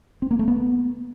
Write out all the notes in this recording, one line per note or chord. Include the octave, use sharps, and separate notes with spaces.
C4
A#3
A3
B3